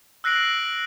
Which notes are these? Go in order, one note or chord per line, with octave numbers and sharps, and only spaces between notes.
E6 F#6 A#6 C7 D7 F#7